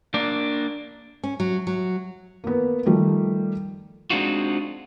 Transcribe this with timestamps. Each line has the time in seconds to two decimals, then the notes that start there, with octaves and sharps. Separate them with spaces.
0.14 A#3 D4
1.24 C#4
1.40 F#3
1.67 F#3
2.44 A#3 B3
2.85 D#3 F3 G3 A3
4.10 G#3 C4 D4 D#4 F4 F#4